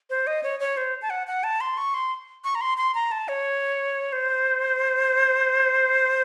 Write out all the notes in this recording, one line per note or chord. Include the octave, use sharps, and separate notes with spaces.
C5
D#5
C#5
C#5
C5
A5
F#5
F#5
A5
C6
C#6
C6
C#6
A#5
C6
C6
A#5
A5
C#5
C5